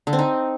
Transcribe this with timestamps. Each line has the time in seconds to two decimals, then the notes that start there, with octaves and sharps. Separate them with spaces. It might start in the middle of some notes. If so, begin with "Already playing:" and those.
0.07 D3
0.13 C4
0.19 D#4